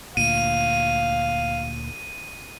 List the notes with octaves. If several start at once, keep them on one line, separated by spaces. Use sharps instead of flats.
D2 A#2 F5 D#7